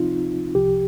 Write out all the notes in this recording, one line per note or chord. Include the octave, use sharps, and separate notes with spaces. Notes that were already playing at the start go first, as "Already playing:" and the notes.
Already playing: C2 C3 F3 C4 D#4 F4
C2 C3 F3 G4